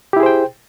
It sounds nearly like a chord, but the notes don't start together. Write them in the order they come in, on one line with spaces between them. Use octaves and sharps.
G4 E4 G#4 C5 G5